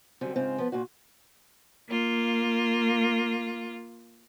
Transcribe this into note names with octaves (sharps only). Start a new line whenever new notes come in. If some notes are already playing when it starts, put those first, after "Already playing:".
F#2 D3 G3 C4
G#2 C#3 C4 F4
F3 B3
A#2 F4 F#4
A#3 F4